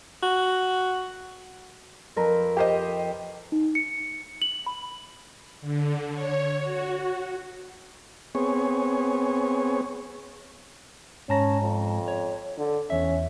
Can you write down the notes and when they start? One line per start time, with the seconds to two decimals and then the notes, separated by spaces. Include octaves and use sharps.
0.23 F#4
2.16 F2 A#4 B4
2.57 G4 C5 D#5
3.52 D#4
3.75 C#7
4.42 F#7
4.66 B5
5.61 D3
6.12 C#5
6.61 F#4
8.35 B3 C4 G#4 C#5
11.29 G#2 C#4 A5 A#5
11.61 F2
12.08 C#5
12.58 D3
12.90 E2 C#4 E5